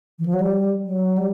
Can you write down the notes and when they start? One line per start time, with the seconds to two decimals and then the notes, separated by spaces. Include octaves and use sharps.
0.19 E3
0.25 F3
0.33 F#3
0.40 G3
0.84 F#3
1.18 G3